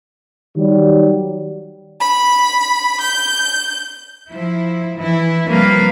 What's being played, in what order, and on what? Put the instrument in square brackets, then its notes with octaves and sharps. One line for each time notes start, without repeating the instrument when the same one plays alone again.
[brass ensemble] D#3 F#3 G3
[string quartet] B5
G6
[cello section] F3 E4
E3 E4
C3 F3 G3 A#3 B4 F5